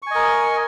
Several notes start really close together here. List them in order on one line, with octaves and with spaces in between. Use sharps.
C#6 G#5 D#5 A#4